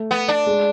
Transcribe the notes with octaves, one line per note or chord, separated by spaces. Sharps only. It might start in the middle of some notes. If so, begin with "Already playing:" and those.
Already playing: A3
B3
D4
G#3